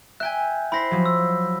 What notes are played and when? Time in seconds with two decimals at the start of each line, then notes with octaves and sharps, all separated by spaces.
0.20 E5 G5 G#5 F#6
0.72 E4 C5 B5 A#6 B6
0.91 F3 F#3
1.06 E6